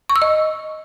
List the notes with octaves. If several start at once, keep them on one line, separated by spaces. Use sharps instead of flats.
C#6
E6
D#5